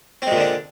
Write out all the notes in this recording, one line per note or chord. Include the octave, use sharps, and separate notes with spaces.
A#2 D3 G#3 C4 D4